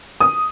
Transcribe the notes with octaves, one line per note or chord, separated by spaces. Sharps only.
D#6